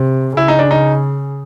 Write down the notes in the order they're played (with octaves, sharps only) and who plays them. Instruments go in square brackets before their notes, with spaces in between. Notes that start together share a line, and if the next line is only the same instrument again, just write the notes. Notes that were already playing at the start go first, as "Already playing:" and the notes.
Already playing: [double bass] C3
[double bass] C#3 [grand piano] E4
[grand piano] D#4
D4
D#4